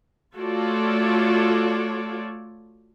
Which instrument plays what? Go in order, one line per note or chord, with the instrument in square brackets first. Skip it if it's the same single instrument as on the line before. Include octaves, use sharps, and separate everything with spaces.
[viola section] A3 F4 F#4 A4 C#5 D5